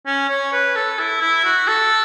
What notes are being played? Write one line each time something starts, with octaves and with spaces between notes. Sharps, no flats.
C#4
C#5
B4
A4
E4
E4
F#4
A4